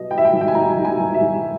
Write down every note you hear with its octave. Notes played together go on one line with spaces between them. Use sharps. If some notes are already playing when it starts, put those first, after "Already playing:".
Already playing: B1 B2 D#5
B2 G5
E5
G5
B1
G5
G#5
B1 A#5
B1
G#5
B1
E5
B1